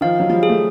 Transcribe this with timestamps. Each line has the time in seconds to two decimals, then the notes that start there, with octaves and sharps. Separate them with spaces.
0.01 D#3 F3 F5
0.20 F#3
0.30 F3 G3
0.43 G#4
0.49 A3